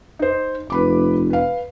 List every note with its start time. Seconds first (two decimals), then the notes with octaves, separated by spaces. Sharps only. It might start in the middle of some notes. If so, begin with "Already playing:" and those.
0.19 D#4 C5
0.70 F1 B4 B5 D6
1.30 B4 F5